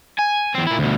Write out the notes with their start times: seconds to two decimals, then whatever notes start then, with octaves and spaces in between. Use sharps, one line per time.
0.19 G#5
0.55 E2 C4
0.67 A#2 E4
0.79 D2 B2